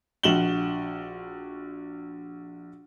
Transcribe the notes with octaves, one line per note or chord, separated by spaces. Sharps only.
A#1 F#4 E7 F#7 G7